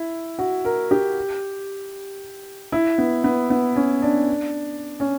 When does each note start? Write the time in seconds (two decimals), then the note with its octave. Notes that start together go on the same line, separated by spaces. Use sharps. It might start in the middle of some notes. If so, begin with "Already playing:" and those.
Already playing: E4
0.39 F#4
0.65 A#4
0.91 G4
2.72 E4
2.98 B3
3.24 B3
3.50 B3
3.76 C#4
4.02 D4
5.00 C#4